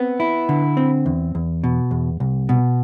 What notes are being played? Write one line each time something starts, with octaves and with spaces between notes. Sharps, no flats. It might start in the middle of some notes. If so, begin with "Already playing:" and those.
Already playing: B3 C4
E4
D3
C4
E2
E2
B2
E2
C2
B2